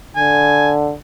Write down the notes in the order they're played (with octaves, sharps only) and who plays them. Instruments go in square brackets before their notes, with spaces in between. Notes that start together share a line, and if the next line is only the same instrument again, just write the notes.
[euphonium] D3 [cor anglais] G#5